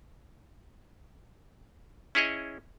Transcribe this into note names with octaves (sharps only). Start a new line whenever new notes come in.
C#4 E4 G#4 C#5 D#5